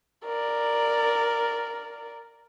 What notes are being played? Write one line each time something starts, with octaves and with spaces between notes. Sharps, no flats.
A#4 D5